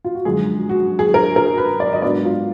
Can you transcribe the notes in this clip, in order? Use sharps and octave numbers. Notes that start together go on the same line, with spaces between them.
F4
F#4
F#2 D3 F3 G#3 G#4
F#4
G#4
A#4
A#4
B4
D5
D#5
G#2 F#3 B3 D4 D5
F4